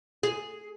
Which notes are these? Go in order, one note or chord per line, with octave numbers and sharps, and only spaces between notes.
G#4